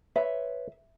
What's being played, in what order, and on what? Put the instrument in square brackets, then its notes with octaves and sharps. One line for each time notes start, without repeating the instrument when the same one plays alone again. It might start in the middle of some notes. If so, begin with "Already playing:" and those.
[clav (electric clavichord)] B4 C#5 [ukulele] E5